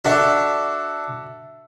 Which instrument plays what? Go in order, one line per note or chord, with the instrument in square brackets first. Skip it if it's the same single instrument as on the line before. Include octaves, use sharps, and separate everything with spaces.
[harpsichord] D4 [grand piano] F#4 A4 E5